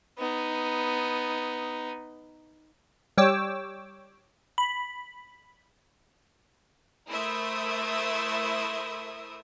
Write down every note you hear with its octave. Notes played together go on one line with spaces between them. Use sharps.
B3 D#4
G3 C#5 G5 D6 E6
B5
A3 E4 A#4 C5 E5 D#6